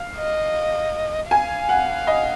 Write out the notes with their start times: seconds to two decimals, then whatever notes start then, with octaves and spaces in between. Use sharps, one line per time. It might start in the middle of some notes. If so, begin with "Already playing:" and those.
Already playing: F5
0.17 D#5
1.31 F5 G#5
1.69 F#5
2.07 D#5